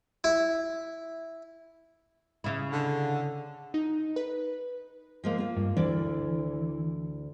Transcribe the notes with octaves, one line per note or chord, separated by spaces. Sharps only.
E4
C#3 E4
D3
D#4
B4
F3 G#3 A#3
A#3 F4
G2
D2 E3 D4 D5